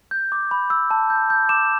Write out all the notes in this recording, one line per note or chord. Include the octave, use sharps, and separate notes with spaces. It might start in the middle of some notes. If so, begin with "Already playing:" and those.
G6
D6
B5
E6
A5
G6
G6
D6 E7